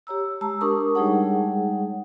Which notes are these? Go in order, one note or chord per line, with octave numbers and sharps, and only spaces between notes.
G4 C#5 A#5 E6
G#3 A5 A#5 E6
D4 G4 A#4 A5 C#6 D#6
G3 G#3 D#4 G#4 C#5 F#5